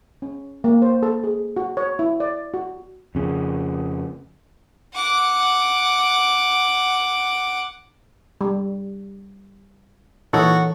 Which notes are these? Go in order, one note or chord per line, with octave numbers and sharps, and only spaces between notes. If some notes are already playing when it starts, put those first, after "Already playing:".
C#4
A#3
C5
A4
G#4
F#4
C#5
E4
D5
F#4
F2 C#3
F#5 D6
G3
A#2 E3 D#4 F#4 A4 C#5